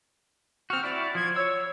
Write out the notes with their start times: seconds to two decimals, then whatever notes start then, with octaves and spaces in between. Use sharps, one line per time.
0.70 C4 F#4 F6
0.84 E4 F#4 D5
1.15 F3 G#6
1.36 C#5 E6